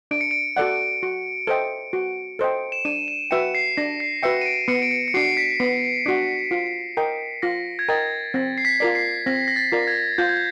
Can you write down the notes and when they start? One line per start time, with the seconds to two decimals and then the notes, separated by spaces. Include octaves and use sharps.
0.11 D4 D7
0.21 C#7
0.31 D7
0.57 F#4 A4 D5 F#5
1.03 F#4
1.47 A4 C5 D#5 G5
1.93 F#4
2.39 A4 C5 D#5 G5
2.72 E7
2.85 D4 D#7
3.08 E7
3.31 F#4 B4 E5 G5 C#7
3.55 C7
3.77 D4 A#6
4.00 C7
4.23 F#4 B4 E5 G5 C#7
4.41 D#7
4.46 D7
4.68 B3 C#7
4.82 D7
4.91 C#7
5.08 C#7
5.14 D4 F#4 C7
5.37 B6
5.60 B3
6.06 D4 F#4
6.51 F4
6.97 A#4 D#5 G5
7.42 F4 A#6
7.79 G#6
7.89 A#4 D#5 G5 A6
8.34 C4 A#6
8.58 C7
8.65 B6
8.80 F4 A#4 D5
8.95 C7
9.26 C4 A#6
9.48 A#6
9.56 A6
9.72 F4 A#4 D5
9.87 G#6
10.18 F4 G6
10.29 G#6